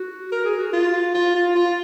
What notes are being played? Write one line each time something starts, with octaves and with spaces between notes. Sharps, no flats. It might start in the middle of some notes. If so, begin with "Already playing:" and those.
Already playing: F#4
A#4
G#4
F#4
F4
F4
F4
F4